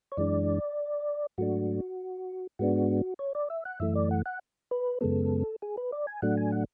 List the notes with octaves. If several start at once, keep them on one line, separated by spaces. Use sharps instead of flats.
C#5
F#2 E3 G#3 D4 D5
G#2 F#3 A3 D4 F#4
G#2 G#3 B3 D4 F#4
C#5
D5
E5
F#5
F#2 E3 A3 E5
D5
F#5
F#5
B4
F#2 C#3 G#3 B3 A4
G#4
B4
D5
G#5
A2 F#3 A3 D4 F#5
G#5
F#5